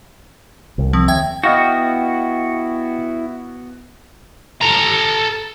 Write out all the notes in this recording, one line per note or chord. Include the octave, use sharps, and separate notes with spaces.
C2
F3 C4
D#2 E5 G5 G#6
B3 E4 F#4 D#5 F5 G5
A4 A#5